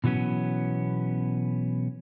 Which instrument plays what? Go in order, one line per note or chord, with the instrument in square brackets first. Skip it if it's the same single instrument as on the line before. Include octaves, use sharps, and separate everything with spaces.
[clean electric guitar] B2 E3 F#3 B3 C#4